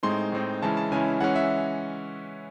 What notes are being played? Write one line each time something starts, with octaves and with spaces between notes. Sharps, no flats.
A2 G#3 C4 D#4 C6
A2 G#3 C4 D#4
C#3 E3 G#3 C#4 E4 A5
A5
C#3 E3 G#3 C#4 E4 G#5
E3 G#3 C#4 F#5
E5